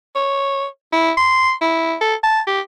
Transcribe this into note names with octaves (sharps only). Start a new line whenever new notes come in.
C#5
E4
C6
E4
A4
A5
G4